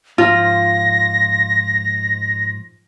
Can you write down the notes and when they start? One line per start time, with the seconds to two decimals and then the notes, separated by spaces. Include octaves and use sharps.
0.18 G#2 F3 F4 A#6